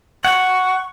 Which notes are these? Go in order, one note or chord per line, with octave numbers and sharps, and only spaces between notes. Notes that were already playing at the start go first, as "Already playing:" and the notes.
F#5 C#6